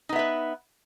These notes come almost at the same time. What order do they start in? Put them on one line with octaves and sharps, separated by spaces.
D#4 B3 E5 B4